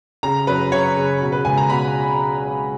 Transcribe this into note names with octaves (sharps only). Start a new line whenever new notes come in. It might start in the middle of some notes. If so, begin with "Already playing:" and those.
C#3 A#5
F#2 B4
C#3 C#5
C#3
B2
B4
C#2 G#5
A#5
B2 B5